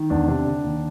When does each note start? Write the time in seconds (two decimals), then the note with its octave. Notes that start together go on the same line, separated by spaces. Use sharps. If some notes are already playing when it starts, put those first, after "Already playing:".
Already playing: D#3
0.10 E2 D4
0.28 C3 D4
0.47 D3
0.64 D#2